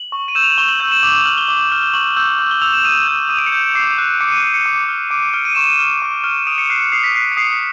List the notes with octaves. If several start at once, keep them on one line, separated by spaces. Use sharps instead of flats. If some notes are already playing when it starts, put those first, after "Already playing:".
Already playing: F#7
C#6
D#7
E6 G6 E7
F7
F#7
C#6 G7
F#7
E6 G6 F#7
E7
D6 F7
F7
F6 F#7
G7
D6
F6
G7
C#6 F#7
E6 G6
C#6 F#7
G7
E6 G6 F7
E7
D#6 D#7
G6
D#6 D#7
D7
C#7
G6 D7
D6 C7
F#6
D6 C#7
D#7
F#6 D#7
C#7
D6
F6
D6 D7
D7
F6 D7
D#7
C#6 E7
D#7
F6
C#6
F6
D#6 D7
C#7
F#6 C7
C#7
D#6 C7
B6
F#6 C7
C#7
D#6 C7